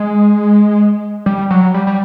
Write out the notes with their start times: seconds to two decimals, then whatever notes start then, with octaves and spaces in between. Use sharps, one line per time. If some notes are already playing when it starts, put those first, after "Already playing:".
Already playing: G#3
1.26 G3
1.50 F#3
1.74 G3
1.87 G3